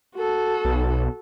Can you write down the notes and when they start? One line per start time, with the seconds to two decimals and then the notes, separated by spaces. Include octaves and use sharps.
0.16 F#4 A4
0.65 B1